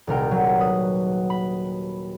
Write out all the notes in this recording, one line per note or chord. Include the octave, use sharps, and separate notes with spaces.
D#1 C2 A#4 G5
F#3
B4 D#6
B5